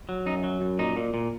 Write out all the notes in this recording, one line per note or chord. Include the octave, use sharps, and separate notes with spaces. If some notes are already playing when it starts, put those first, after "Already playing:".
F#3
F#2 D#4
F#3
F#2
A#2 D#4
A#2
A#2